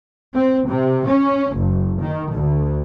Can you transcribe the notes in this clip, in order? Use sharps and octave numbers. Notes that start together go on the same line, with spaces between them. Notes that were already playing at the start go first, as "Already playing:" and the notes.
C4
C3
C#4
F#1
D#3
D2